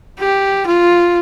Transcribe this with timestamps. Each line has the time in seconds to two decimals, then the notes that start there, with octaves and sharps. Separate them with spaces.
0.19 G4
0.66 F4